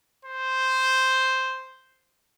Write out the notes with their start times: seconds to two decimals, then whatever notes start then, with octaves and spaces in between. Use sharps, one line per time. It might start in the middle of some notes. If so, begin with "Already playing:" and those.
0.25 C5